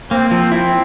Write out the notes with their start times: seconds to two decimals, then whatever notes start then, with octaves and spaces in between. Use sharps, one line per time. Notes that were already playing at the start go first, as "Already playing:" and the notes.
0.11 A#3 C4
0.31 F3
0.52 C4 E4